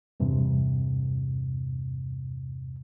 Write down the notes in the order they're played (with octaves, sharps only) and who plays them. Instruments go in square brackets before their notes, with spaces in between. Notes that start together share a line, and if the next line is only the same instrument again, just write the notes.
[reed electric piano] E2 G2 C3